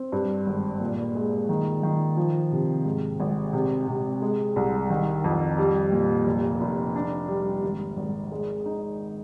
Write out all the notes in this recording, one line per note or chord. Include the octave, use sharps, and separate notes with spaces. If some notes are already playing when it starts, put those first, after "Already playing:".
Already playing: C4
G2
G#1
A#2
G#3
D#3
D#3
F3
C3
G#2
G#1
C3
C3
G#3
C2
D#3
F2
G3
A#2
F1
F1
D4
G3
G#1
G#1
G#3
D#4